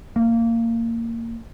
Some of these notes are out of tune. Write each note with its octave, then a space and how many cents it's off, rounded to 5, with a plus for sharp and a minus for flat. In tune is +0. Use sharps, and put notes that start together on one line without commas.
A#3 -20